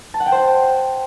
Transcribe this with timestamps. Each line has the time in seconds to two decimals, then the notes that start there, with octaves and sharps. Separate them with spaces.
0.14 A5
0.20 F#5
0.26 G5
0.32 C5